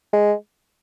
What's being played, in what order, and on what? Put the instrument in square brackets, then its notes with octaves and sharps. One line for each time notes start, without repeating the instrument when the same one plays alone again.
[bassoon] G#3